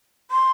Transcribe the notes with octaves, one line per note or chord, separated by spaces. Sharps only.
C6